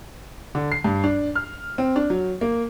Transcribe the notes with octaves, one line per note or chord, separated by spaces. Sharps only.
D3
C7
G2
D4
F6
C4
D4
F#3
A#3